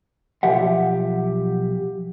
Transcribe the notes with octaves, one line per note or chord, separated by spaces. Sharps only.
B1 F3 G4 E5 F#5